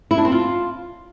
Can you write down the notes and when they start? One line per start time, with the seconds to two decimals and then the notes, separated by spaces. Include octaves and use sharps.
0.11 E4
0.18 D4
0.25 C4
0.32 F4